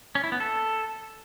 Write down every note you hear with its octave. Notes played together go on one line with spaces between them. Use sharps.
C#4
E4
B3
A4